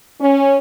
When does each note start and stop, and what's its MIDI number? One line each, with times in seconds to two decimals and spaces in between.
0.21 0.57 61